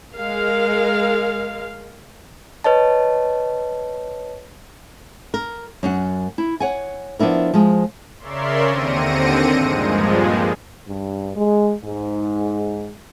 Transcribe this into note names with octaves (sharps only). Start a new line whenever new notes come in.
G#3 A#4 F5
B4 C#5 D#5 A5
A#4
F#2 F#5
E4
C#5 F#5 G#5
F3 B3 D4 E4 A#4
F3 G#3
C#3 A#4 C#5 D5 E5 C6
D#2 D3 C4 A#6 C#7 D#7
G2 A#2 F3 G#3
G2
G#3
G#2